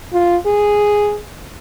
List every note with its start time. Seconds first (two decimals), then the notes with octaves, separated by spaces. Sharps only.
0.13 F4
0.46 G#4